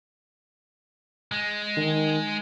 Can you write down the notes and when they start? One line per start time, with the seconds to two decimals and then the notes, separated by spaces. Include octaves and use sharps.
1.32 G#3
1.77 D#3